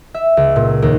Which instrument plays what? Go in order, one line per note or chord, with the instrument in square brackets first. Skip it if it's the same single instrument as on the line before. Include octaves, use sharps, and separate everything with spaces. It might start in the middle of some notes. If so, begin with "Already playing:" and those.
[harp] E5
C#2
A#2
D#2